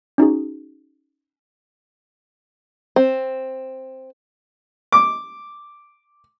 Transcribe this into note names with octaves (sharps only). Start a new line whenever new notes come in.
C#4 D#4 F#4 G#4
C4
D6